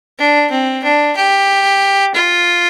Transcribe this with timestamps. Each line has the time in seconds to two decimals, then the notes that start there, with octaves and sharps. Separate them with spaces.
0.19 D4
0.51 C4
0.84 D4
1.16 G4
2.14 F4